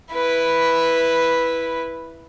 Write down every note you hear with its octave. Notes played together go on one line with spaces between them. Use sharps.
E4 B4